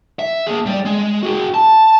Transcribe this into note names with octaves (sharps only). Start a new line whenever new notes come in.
E5
A#3 G#4
G3 D5
G#3
F#4 G#4
A5